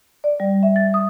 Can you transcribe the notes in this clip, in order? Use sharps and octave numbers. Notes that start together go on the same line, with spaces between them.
D5
G3
E5
A6
D#6